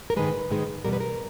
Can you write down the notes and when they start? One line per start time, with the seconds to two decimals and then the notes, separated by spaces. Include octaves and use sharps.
0.10 A#4
0.17 G#2 D#3 G#3 B4
0.50 G#2 D#3 G#3
0.85 E2 B2 G3 A#4
0.93 B4
1.01 A#4